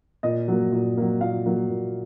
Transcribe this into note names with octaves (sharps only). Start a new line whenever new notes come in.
A#2 D#5
F#3 A#3
A#2
F#3 A#3
A#2 F5
F#3 A#3
A#2